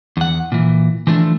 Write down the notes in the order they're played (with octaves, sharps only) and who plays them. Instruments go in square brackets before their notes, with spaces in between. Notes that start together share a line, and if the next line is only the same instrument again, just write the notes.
[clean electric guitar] E2 F#5
A#2 E3
E3 F3 A3 D4